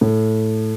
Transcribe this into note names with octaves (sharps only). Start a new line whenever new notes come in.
A2